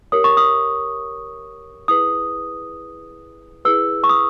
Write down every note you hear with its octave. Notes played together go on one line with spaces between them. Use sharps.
G4 A#4 C#5 D#6
C#6
D#6
E4 G#4 B4 D#6
E4 G#4 B4 E6
C#6
D#6